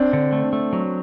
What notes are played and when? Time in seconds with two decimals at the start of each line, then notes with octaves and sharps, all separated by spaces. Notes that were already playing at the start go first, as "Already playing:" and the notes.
Already playing: C4 D4
0.13 D3
0.33 A3
0.53 A3
0.73 F#3